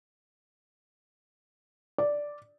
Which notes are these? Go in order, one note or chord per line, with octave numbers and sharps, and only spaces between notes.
D5